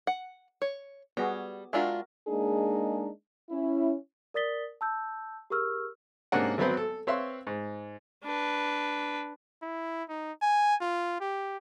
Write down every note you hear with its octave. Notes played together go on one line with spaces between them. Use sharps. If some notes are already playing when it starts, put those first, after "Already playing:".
F#5
C#5
G3 B3 F#4 G#4
G#3 D4 F4 F#4 A#4 E5
G#3 A#3 D4 D#4 G#4
C#4 E4
A#4 D5 D#6 A6 B6 G7
A5 E6 G6
G4 G#4 A#4 C#6 E6 F6
G#2 C3 A#3 C#4 D4 F#5
G#1 F#3 B3 C4 B4 C5
A4
C4 B4 C#5 E5 F5 C6
G#2
D4 B4
E4
D#4
G#5
F4
G4